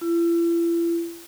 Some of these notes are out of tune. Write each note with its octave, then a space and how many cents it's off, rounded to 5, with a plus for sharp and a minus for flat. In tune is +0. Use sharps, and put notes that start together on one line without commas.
E4 +40